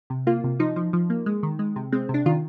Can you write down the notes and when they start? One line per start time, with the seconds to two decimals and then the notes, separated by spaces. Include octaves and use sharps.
0.10 C3
0.27 A#3 F4
0.44 C3
0.60 F3 D#4
0.76 F3
0.93 F3
1.10 A#3
1.26 G#3
1.43 D#3
1.59 G#3
1.76 C3
1.92 G#3 C4
2.09 C3
2.14 D4
2.26 D#3 F4